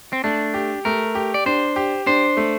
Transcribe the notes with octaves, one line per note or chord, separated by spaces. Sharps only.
C4
A3 D4
G4
A3 A#4
G4
D5
D4 C5
G4
D4 C5
A3